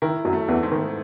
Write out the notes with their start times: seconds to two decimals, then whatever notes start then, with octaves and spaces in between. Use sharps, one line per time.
0.02 D#3 E4
0.25 F#2 F#3
0.33 A3
0.48 E2 E3
0.63 G#2
0.72 D#3